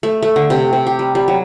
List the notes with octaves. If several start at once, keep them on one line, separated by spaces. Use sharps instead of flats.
A3
A3
D3
C3
C3
G4
G3
G3
F#3